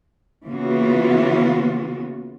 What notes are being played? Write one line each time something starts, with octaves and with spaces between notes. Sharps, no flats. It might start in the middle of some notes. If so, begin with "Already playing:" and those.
C#3 E3 A#3 B3 F4 F#4